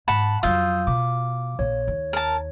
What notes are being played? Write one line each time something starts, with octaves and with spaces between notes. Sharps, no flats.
G#2 F#5 A5 B5
F2 F#3 F4 D#6 E6 G6
B2 D6
A#1 C#5
D#2
A#4 A5